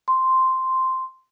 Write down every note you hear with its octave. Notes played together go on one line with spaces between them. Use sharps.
C6